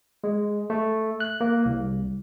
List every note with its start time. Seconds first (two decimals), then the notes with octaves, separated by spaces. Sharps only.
0.24 G#3
0.70 A3
1.20 F#6
1.41 A#3
1.65 C2